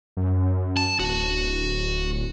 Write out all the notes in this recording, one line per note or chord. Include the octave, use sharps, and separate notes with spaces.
F#2
A5
D1 F#4